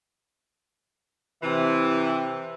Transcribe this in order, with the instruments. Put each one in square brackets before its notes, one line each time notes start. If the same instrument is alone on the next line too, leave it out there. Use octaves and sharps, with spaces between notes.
[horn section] C3 E3